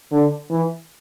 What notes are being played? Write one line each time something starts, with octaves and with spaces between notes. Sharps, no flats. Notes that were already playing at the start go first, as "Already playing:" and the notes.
D3
E3